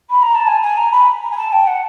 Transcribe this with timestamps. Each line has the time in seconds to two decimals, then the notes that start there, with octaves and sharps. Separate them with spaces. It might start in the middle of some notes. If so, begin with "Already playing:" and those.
0.10 B5
0.22 A#5
0.35 A5
0.47 G#5
0.62 G#5
0.77 A#5
0.91 B5
1.22 A#5
1.30 G#5
1.37 A5
1.52 G5
1.67 F#5